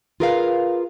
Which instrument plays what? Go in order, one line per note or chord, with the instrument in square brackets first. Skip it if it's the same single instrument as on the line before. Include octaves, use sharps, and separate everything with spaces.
[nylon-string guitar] F4 G#4 A#4 B4 D#5 F5